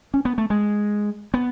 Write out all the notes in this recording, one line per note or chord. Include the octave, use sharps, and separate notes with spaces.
C#4
B3
A3
G#3
B3